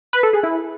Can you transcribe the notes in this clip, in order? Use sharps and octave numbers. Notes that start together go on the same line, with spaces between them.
B4
A4
G#4
E4